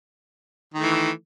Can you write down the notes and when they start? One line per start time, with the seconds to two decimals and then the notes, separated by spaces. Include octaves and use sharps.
0.74 D#3
0.78 A3
0.82 E3